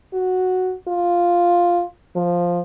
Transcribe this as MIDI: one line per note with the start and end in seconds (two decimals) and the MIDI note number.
0.14 0.74 66
0.88 1.84 65
2.15 2.60 53